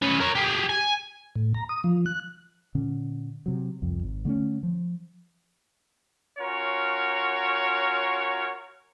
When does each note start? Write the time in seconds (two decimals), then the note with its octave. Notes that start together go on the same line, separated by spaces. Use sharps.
0.02 C#4 B4
0.20 A#4 C#5
0.35 G4 G#4
0.70 G#5
1.36 A2
1.54 A#5
1.69 D#6
1.84 F3
2.06 F#6
2.75 A#2 D3 C#4
3.46 C3 F#3
3.82 C2 F2
4.03 G#1
4.25 D3 A3 C4 C#4
4.63 F3
6.39 C#4 F4 F#4 A#4 C#5